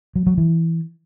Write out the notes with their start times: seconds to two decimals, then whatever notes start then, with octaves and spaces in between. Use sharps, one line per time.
0.16 F#3
0.27 F#3
0.38 E3